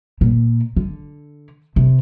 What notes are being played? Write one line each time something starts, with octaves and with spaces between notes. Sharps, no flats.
A#2
D3
C3